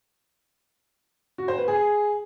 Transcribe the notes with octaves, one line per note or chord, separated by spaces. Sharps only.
F#4
C5
B4
G#4